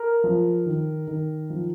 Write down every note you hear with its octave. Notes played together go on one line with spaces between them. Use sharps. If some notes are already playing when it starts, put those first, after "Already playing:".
Already playing: A#4
F3
D#3
D#3
F3